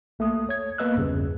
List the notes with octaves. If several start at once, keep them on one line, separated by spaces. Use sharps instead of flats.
B1 A3 A#3 D#6
C#5 G#6
A#3 B3 B4 D#5 E6 F#6
A1 E2 G2 C#3 G3